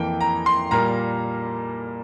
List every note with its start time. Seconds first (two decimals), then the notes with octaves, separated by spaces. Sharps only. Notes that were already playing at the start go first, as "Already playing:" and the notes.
Already playing: F2 E3 A#3 G5
0.21 A#5
0.46 C6
0.71 A#2 G3 A#3 A#5